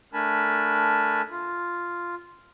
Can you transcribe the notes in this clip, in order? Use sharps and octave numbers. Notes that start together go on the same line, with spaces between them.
A3 D4 A#4 G#5 A5 B5
F4